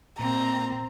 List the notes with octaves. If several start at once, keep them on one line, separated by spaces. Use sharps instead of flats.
A#2 C4 A#5